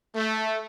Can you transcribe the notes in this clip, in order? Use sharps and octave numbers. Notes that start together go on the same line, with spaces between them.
A3